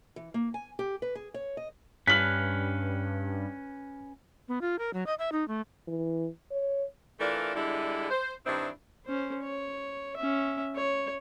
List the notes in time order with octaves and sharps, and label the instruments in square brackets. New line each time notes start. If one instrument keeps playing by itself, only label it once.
[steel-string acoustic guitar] E3
A#3
G#5
G4
B4
G#4
C#5
D#5
[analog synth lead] G2 [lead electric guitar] C#4 B4 [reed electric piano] F6 F#6 [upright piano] B6 F#7
[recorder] B3
F4
A#4
F#3
D#5
E5
D#4
A3
[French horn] E3
C#5
[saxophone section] E3 A3 D4 F4 A#4 D5
D3 G3 G#3 E4
C5
G2 D#3 C4 D4 E4
[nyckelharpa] C#4 C5
C#5
C#4 E5
C#5